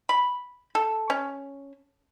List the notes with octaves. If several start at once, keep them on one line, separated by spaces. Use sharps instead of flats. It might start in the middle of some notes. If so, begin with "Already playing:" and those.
B5
A4
C#4